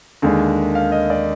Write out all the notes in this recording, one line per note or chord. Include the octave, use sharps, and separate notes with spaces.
D#2 D3 G#3 D4
F5
D#5
D5